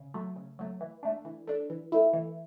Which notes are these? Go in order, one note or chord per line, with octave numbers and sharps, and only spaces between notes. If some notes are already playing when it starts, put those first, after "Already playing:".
Already playing: C#3
F#3 A3
C#3
F#3 A3
E3
A3 D4
E3
A3 D4
E3
A3 E4
E3